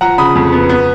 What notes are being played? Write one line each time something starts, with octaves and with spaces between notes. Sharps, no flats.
F3 F#5 A#5
C#3 B5 D#6
F2
B3
B3